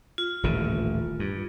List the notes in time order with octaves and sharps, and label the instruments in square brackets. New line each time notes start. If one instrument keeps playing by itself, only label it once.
[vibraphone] F4
[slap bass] D#1 A1 D3
G2